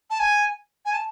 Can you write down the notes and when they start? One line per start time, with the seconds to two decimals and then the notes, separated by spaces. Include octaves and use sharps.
0.10 A5
0.20 G#5
0.85 G#5
0.93 A5